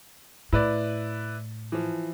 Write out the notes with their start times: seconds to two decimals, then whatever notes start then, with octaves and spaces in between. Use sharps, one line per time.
0.53 A2 E4 B4 D5
1.72 E3 F3